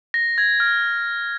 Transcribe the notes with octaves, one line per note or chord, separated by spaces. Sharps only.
A#6
G#6
F6